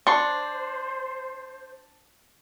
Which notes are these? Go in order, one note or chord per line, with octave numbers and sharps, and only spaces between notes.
D4 C5 C6 C#6